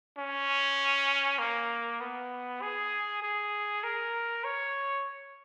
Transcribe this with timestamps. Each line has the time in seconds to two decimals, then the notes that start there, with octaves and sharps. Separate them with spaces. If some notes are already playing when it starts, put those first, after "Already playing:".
0.18 C#4
1.39 A#3
2.00 B3
2.62 G#4
3.23 G#4
3.84 A#4
4.44 C#5